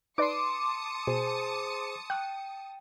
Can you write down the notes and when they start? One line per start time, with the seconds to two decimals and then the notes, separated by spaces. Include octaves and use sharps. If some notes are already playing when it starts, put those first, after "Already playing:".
0.18 D#4 B4 D5 A5 C6 D6 D#6 C#7
1.07 B2 G#4 C5
2.10 G5 C#6 F6 F#6